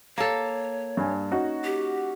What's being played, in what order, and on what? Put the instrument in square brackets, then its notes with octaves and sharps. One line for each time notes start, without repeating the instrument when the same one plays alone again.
[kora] A#3 A4 [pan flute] C#5
[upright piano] G2 G#5
C#4 D#4 F#4
[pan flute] G4